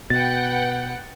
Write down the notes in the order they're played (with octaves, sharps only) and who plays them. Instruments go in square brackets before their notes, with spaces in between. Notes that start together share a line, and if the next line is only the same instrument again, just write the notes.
[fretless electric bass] B2 [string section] B4 F#5 G5 [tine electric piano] A6